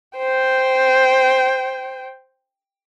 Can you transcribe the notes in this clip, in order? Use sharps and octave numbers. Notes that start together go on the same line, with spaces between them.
C5 G5